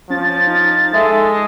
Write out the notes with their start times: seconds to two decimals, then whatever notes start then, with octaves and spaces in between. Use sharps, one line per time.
0.10 F3 C#4 A6
0.47 D#4
0.94 G#3 A4 E5